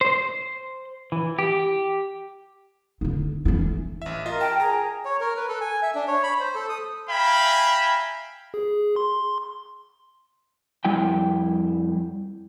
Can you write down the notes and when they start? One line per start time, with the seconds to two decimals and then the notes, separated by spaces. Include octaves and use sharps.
0.01 C5
1.12 E3
1.39 G4
3.01 D3 E4
3.45 E3 E4
4.02 A1 E5
4.26 F4 A#4 D#5
4.41 G5 A5
4.60 G#4 A#5 A#6
5.05 C#5
5.21 A#4
5.36 B4
5.49 A4
5.61 G#5
5.82 E5
5.95 D4
6.08 C#5
6.23 B5
6.40 C5
6.55 A4
6.69 D#6
7.09 E5 F5 G5 G#5 A#5 B5
8.54 G#4
8.96 C6
10.85 F2 G3 E4 G5